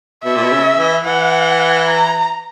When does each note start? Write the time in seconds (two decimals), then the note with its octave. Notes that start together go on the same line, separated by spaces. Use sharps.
0.23 B2 E5
0.35 A#2
0.43 B2
0.51 C#3
0.78 E3
1.05 E3 F#5
1.87 A#5